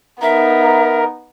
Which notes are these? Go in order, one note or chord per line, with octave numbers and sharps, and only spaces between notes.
B3 D#4 A#4 E5